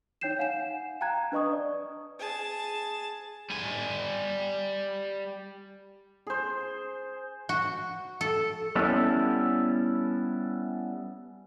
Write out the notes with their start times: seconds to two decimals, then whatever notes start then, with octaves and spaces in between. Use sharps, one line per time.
0.21 D#4 C#5 G5 G6 C7 E7
0.39 F5 F#5 G#5 E7
1.01 F5 G5 A5 A#5 F#6 G#6
1.32 D4 B4 D#5 C#6 D#6
1.52 D5
2.19 G#4 A5
3.50 G3 G#5
6.27 G#4 C5
7.49 F#4
8.21 A4
8.76 G3 B3 C#4 E4 A4